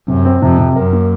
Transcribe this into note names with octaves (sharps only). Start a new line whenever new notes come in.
F#2 C3
C4
F2 C3
C3
F#2 A#4
A#3